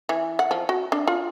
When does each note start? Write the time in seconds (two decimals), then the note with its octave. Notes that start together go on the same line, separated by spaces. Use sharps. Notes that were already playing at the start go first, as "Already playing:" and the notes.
0.09 E3
0.39 F#5
0.51 F3
0.69 F#4
0.92 D4
1.07 F4